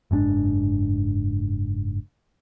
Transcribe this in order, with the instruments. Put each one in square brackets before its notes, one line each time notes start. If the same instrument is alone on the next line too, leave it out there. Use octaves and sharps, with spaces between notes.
[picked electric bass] F#1 G#2 C#4 D4